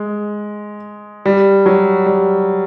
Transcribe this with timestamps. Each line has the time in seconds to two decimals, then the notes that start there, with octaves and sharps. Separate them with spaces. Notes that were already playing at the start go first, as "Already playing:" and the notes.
Already playing: G#3
1.26 G3
1.66 F#3
2.06 G3